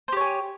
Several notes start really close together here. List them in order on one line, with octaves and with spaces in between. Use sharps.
C5 G4 C#5 G#5